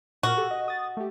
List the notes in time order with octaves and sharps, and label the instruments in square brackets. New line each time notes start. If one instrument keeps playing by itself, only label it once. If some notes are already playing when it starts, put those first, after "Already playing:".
[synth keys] A#2 A#4 F6 [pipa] F#4
[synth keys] G4 A4
D#5
D#6 A6
A3 G4